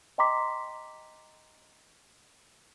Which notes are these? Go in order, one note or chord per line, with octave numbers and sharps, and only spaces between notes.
D#5 G5 A#5 C6 D6 B6